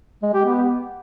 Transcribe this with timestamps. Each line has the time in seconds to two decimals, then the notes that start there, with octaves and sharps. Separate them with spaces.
0.23 G#3
0.34 G4
0.45 B3